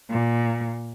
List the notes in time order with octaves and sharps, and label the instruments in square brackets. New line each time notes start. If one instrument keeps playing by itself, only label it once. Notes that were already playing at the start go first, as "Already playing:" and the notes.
[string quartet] A#2